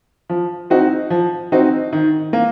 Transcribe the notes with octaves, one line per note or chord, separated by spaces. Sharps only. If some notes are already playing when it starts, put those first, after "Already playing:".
F3
C4 D#4 F#4
F3
C4 D#4 F#4
D#3
A#3